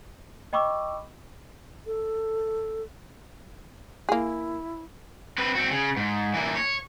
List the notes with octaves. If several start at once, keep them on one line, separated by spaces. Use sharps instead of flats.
D#5 G5 B5 C#6 D6 E6
A4
A#3 E4 G#4
C4 B4
C4 F#4
C#3
G#2
E3 A#3
C#5